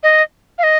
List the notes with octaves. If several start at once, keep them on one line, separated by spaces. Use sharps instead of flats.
D#5
F5
D#5